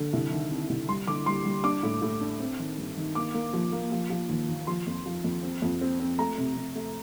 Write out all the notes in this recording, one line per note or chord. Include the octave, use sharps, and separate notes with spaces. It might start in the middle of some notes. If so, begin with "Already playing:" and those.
Already playing: D3
C2
D#3
C3
C2
G3 C6
D3 D6
G3 C6
G3
D4 D6
A2
A2
D4
C4
D#3
G2
D#3
A#3 D6
A#3
F3
A#3
F3
F3
D#2
D#2
F3 C6
F2
F3
F2
C4
F2
C4
C4
A3 A#5
C3
C3
A3